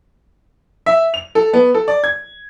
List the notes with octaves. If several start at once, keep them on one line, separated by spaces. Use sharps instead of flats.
E5
F7
A4
B3
A4
D5
G#6